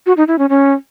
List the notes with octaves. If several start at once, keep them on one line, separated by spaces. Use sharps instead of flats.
F#4
D#4
E4
C#4
C#4